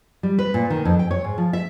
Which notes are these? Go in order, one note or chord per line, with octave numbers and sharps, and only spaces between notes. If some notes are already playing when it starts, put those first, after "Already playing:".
G3
B4
A#2
D#3
F2
G5
C#5
G#2
F3
E5